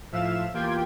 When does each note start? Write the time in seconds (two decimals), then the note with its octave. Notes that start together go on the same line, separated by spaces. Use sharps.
0.12 A2 F3 E5 F5 E7
0.54 E2 A#3 F4 G4 G5 G#6